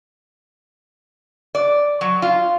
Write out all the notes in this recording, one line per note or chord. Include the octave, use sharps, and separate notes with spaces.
D5
F#3
F4